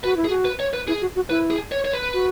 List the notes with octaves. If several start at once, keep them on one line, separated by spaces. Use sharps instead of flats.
F#4 B4
E4
G#4
F#4
B4
C#5
B4
E4 G#4
F#4
F#4
E4 B4
G#4
C#5
C#5
B4
F#4